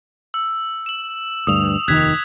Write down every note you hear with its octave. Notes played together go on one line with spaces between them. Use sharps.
E6
E7 F#7
D2 G2 D#6 F7
F1 D#2 D#3 F#6 G#6 B6